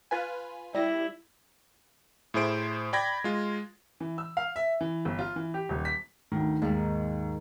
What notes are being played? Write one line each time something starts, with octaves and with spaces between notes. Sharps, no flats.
F4 B4 G#5
G3 E4 A#6
A2 E4 G#4 C5 D7
D5 G5 B5 G#6 A#6
G#3 F4
E3
E6
F5
E5
E3
G1
F4
E3
G4
D#1
B6
D2 D#3
D#2 G#2 D#3